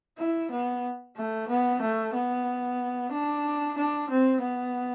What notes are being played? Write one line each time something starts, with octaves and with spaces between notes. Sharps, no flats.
E4
B3
A3
B3
A3
B3
D4
D4
C4
B3